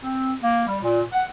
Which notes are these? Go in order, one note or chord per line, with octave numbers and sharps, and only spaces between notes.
C4
A#3
G3
A#2
F#5